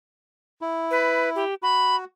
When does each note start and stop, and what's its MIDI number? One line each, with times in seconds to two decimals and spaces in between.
0.61 1.44 64
0.91 1.30 71
1.36 1.55 67
1.63 2.05 66
1.63 1.96 83